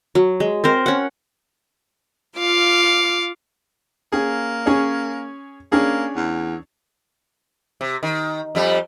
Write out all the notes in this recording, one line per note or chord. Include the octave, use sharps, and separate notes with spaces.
F#3
G#3
C4 A#4 C5
C#4 F#5
F4 F5 D6
A#3 C#4 G#4
C#4 G#4 C#5
A#3 C#4 D4 G#4
E2
C3
D#3
F2 G3